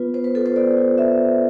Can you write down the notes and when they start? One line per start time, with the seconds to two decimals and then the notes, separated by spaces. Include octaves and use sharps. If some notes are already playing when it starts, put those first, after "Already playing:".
Already playing: B3 F4 B4
0.14 B3 C5
0.24 B4
0.35 F4 A4
0.46 C5
0.56 B3 D5
0.77 F4
0.97 B3 E5